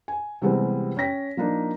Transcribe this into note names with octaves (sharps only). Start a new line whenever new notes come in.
G#5
C3 E3 G3 G#3 B3 C4
C#4 G5 A#6 B6
F3 A#3 D4 D#4